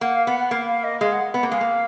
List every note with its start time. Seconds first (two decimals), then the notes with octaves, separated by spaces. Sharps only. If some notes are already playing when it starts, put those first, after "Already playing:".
0.01 A#3 F#5
0.15 F5
0.27 B3 F#5
0.40 F#5
0.51 A#3 F5
0.67 F5
0.84 D#5
1.00 G#3 F5
1.12 F#5
1.34 B3
1.43 A#3
1.50 G#3 F5
1.61 A#3